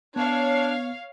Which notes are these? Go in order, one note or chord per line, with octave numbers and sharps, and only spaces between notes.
B3 D4 C#5 F5